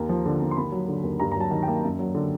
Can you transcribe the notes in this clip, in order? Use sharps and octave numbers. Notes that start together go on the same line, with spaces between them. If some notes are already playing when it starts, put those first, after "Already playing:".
Already playing: D#2 A#5
F3
D3
D#2
C6
D#2 B5
F#3
D3
D#2
G2 A#5
A#5
F#3 A5
D#3
G5
A#3
F#2
F#3
D3